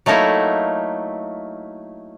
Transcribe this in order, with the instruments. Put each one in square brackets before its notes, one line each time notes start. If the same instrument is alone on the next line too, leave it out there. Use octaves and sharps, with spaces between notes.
[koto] F#3 A3 A#3 D#4 E4